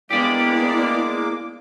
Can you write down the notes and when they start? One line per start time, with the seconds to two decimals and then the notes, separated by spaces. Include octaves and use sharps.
0.11 G#3 A#3 B3 D4 E4 G4 D5 D6